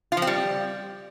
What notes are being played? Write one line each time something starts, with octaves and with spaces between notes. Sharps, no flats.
F4
F3
C4
G3